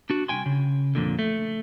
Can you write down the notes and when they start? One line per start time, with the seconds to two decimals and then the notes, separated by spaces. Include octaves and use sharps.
0.10 D4 F#4
0.28 C2 F3 G5 G#5 C6
0.46 C#3
0.95 F2 A#2 D3
1.19 A3